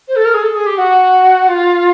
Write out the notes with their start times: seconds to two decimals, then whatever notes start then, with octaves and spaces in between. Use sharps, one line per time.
0.08 C5
0.16 A4
0.25 A#4
0.34 G#4
0.43 A4
0.55 G#4
0.66 G4
0.78 F#4
1.48 F4